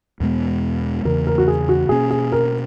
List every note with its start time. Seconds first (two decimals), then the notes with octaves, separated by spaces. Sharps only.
0.20 E2 B2 G#3 B3
1.05 E2 C#3 E3 A#3 A#4
1.27 A#4
1.38 F#4
1.48 G#4
1.69 F#4
1.89 B2 A#3 C#4 G#4
2.10 G#4
2.32 A#4